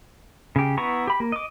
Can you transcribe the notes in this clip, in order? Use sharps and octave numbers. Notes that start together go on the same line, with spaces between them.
C#3 G4
B3 E4 A#5 C#6
G4 B5
A#3
D#5 D6